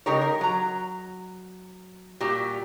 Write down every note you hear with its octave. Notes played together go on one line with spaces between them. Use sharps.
C#3 G#3 D#4 G4 A#4 C#5
A#4
F#3 A#5
A#2 G3 F#4 G4